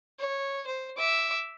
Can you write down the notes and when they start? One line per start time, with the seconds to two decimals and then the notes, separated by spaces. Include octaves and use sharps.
0.19 C#5
0.67 C5
0.98 E5 D6